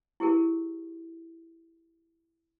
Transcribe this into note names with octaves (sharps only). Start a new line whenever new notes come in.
E4 G4 G#4 A#4